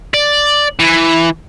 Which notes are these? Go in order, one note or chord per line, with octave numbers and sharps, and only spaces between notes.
D5
E3